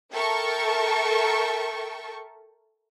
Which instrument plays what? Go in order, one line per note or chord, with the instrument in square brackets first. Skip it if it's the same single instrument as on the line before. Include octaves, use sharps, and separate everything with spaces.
[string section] A4 A#4 E5 G5 A5 C#6